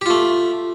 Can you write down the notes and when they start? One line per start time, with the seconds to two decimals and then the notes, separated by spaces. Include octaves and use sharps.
0.01 G4
0.06 F4
0.10 A3